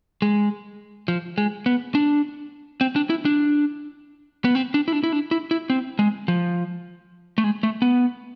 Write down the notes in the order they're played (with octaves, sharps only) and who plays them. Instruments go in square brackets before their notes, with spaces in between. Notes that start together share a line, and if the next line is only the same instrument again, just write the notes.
[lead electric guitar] G#3
F3
G#3
B3
D4
C4
D4
E4
D4
B3
C4
D4
E4
D4
E4
D4
E4
E4
C4
G#3
F3
A3
G#3
A3
B3